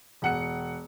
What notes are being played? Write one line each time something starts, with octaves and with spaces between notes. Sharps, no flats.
E1 F#5 C#7